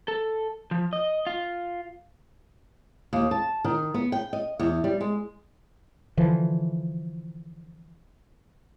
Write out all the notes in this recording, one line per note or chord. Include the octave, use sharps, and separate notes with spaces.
A4
F3
D#5
F4
D#2
A5
D#3
B3
G5
D#5
E2
G3
G#3
D3 E3 F3